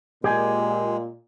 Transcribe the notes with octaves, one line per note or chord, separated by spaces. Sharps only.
A#2 G#3 G4 G#4 G#5